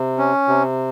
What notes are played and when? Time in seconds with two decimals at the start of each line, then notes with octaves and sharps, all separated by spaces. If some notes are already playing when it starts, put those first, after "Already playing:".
Already playing: C3
0.18 C#4
0.48 C3